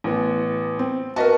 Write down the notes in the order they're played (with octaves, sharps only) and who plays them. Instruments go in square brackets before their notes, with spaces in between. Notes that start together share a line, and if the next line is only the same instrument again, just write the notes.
[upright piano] A1 B3
[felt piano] C4
[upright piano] F#4 D#5 [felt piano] A#4 B4 A5